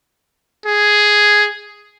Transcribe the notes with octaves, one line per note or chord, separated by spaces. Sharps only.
G#4